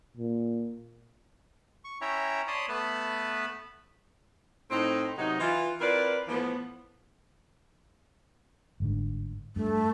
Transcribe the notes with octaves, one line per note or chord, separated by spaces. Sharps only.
A#2
C#6
C#4 E4 C#5 E5 G5 A#5
C#5 D5 A5 B5 C6 D#6
A3 B3 B4 A5 B5
A2 C4 D#4
C3 F#3 B3 D#4
E3 F4
C4 E4 F4 A#4 B4 D5
A2 E3 F3 B3
G1 G#2 D3
G2 A3